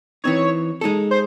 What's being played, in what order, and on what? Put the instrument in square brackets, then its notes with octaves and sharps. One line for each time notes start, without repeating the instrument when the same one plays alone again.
[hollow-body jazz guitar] E3 C4 D#4 [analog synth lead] C#5
[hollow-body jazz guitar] G#3 D#4 A4
[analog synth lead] C5